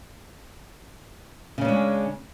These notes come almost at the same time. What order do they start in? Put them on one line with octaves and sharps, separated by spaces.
C#3 C#4 D4 G#3